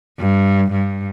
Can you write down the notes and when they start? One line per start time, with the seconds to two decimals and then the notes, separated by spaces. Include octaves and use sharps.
0.19 G2
0.71 G2